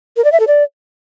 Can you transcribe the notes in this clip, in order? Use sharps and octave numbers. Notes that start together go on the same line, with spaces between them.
A#4
D5
E5
A4
D5